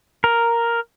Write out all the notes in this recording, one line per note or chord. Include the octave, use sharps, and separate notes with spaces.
A#4